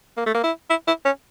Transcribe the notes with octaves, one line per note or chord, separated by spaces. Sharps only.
A#3
A3
A#3
E4
E4
E4
C#4